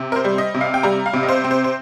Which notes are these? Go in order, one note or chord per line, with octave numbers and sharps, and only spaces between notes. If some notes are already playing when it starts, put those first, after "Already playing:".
Already playing: C3
A#4
C5
G3
D#5
C3
F5
G5
G3 A#5
F5
C3
D#5
C5
C4
C5
C5